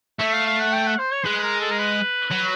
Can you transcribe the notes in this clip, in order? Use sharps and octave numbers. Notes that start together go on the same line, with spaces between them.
A3 E5
F5
F5
F#5
G5
F#5
C5
C#5
G#3 B4
B4
A#4
A4
A#4
B4
F#3